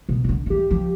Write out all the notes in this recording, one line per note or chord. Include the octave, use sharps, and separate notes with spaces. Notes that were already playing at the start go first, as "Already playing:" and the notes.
B2
E3
D3
F3
E3 G4
F3